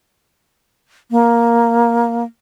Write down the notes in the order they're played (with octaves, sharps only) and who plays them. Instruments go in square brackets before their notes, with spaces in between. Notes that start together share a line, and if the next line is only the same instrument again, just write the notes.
[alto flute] A#3